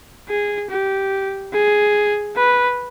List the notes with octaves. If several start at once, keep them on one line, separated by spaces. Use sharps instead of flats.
G#4
G4
G#4
B4